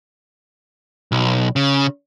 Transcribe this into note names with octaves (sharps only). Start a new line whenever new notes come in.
B1
C#3